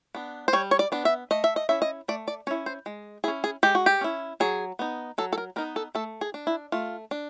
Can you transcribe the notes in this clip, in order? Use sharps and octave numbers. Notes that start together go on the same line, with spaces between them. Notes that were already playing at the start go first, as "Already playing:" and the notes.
B3 D4
C5
G3 C#5
C#5
D5
B3 D4
E5
A3 D#5
E5
D#5
C#4 E4 E5
D#5
A3 D5
D5
C#4 E4 C#5
C5
G#3
C#4 E4 G#4
G#4
G#3 G4
F#4
G4
C#4 E4
F#3 G#4
B3 D#4
F#3 A4
A4
A#4
B3 D#4 A#4
A4
A3 A4
G#4
D4
E4
A3 F4
D4